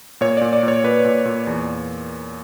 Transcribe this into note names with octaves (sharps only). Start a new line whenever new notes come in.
A#2 C#5
D5
A#2
D5
A#2
C#5
A#2 B4
A#2
A#2
E2